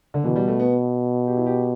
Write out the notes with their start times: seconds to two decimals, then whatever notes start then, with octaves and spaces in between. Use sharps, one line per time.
0.14 D3
0.24 B2 E3
0.36 G3
0.48 A3
0.60 B3
1.27 G4
1.37 E4
1.46 G4